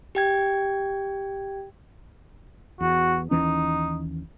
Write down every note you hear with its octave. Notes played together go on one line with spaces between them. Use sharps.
G4 G5 G#6
E2 F#4
D#2 E3 C#4 D#4